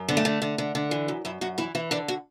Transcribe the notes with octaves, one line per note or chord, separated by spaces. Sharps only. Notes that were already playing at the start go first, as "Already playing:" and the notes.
Already playing: F#2
D3 B3
A3
D3
D3
D3
D3
E3
F#2
F#2 E4
F#2 F#4
E3 E4
E3 E4
D3 D4
F#4